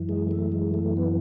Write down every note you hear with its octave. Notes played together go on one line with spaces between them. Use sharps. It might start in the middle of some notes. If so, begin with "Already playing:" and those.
Already playing: F#2 E3
G#3
A3
G#3
A3
B3